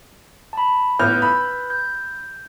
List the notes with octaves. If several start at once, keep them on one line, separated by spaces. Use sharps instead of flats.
A5 B5
A1 B3 B4 F6 G6
B5 E6
G6